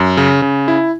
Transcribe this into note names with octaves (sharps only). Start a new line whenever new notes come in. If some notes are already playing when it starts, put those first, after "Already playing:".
Already playing: F#2
C#3
C#3
E4